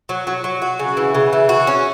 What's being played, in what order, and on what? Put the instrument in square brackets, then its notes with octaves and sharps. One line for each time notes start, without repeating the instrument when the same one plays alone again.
[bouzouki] F#3
F#3
F#3
F#4
C#3
E3
C#3
E3
F#4
C#4